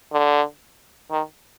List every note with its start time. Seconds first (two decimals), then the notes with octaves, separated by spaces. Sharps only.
0.13 D3
1.11 D#3